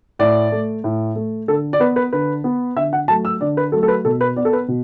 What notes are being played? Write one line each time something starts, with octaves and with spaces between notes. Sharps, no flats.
A2 D5
A3
A2
A3
D3 A4
D5
B3 B4
B4
D3 B4
B3
D3 E5
F#5
F#3 A3 A5
E6
D3 D5
B4
F#3 A3 A4
A4
B4
B2 A4
B4
B3 D5
A4
B4
B2